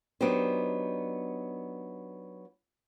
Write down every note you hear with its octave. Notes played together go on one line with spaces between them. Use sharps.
F#3 B3 D4 D#4 G4 C5